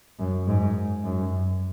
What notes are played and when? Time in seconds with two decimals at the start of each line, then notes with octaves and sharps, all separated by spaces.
0.19 F#2
0.48 G#2
1.04 F#2